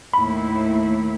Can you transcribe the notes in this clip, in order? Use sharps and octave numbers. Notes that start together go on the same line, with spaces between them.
D#2 A2 E4 B5